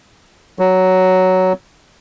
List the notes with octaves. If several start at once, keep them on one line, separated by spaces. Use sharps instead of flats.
F#3